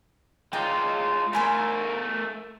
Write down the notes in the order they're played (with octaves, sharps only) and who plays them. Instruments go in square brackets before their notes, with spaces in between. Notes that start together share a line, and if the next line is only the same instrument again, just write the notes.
[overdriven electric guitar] G#3 F4 [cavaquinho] D#4 D5 G5
[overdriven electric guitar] A3 A#4 [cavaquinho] C5 G#5 B5